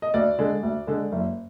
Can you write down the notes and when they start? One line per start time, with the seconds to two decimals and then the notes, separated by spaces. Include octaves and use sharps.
0.02 D#5
0.14 D2 D5
0.39 D3 G#3
0.63 D2
0.87 D3 G#3
1.12 F#1